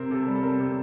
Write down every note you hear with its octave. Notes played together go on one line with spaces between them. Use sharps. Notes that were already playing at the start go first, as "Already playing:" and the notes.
Already playing: C3 C4 A#4
C3 A4
G3
A4
C4 A#4
C3